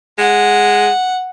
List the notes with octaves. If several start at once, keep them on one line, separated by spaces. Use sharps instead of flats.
G#3 F#5